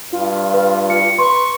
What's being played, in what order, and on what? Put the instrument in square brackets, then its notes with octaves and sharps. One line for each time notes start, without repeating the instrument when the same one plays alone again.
[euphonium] G2 [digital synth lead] F4
[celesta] B4
C#7
[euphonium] B4 [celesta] C6 [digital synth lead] C#6